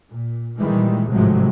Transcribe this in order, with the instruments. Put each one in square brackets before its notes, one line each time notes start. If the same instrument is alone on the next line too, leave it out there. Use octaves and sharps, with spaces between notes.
[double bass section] A#2
A#2 D#3 E3 G3 G#3
G#1 A2 C3 F3 F#3 G#3